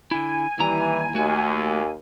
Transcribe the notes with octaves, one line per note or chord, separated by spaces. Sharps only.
D3 E4 G#5
D#2 E3 G3 E4 A#5
D#2 A3 F#4